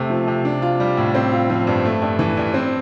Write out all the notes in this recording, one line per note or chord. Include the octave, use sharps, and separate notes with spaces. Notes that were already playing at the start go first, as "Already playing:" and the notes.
Already playing: C3 A3
F3
C3
D4
F4
G3
A2
C4
F4
F3
G2
A3
G2
E3
G2
C4